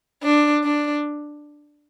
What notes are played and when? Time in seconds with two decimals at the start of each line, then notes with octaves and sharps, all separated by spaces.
0.23 D4
0.64 D4